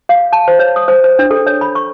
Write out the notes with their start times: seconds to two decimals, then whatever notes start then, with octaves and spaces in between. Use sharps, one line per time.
0.09 F5
0.33 A5
0.48 C5
0.59 C#5
0.76 D#6
0.88 C5
1.04 C5
1.19 D4
1.31 A4
1.46 C#5
1.61 B5
1.75 C#6